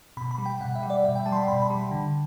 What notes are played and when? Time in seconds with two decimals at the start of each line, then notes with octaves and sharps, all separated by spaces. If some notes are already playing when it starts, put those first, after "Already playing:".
0.17 B2 B5
0.31 B5
0.38 G3
0.46 G5
0.60 B2 F#5
0.75 E5
0.83 G3
0.90 D5
1.04 B2 E5
1.15 G5
1.26 G3 A5
1.32 C6
1.36 B5
1.48 B2 B5
1.62 B5
1.70 G3
1.91 D3